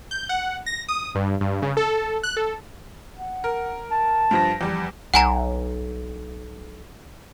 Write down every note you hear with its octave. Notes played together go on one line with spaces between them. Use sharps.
G6
F#5
A#6
D#6
G2
G2
C#3
A4
F#6
A4
F#5
A#4
A5
G2 F3 A#6
E2 F3 G3
B1 F#5 G#5 A#5